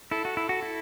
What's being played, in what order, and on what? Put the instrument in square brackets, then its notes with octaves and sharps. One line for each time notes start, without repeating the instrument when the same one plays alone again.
[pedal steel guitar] E4 [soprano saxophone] A4
[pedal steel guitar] F#4
E4
F#4
E4